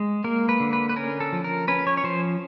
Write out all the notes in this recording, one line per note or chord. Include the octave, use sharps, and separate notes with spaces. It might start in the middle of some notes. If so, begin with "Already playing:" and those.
Already playing: G#3
A#3 A#4
B4
D3
B4
B4
C#4 A#4
A4
F3
A#4
C#4 B4
C#5
C#5
F3 C5